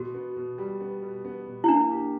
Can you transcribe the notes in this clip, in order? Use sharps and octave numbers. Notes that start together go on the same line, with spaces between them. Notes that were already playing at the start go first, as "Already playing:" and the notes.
Already playing: B2 F#4
B3
B2
G3
B3
B2
B3
B2
E4
A#3 D4
G4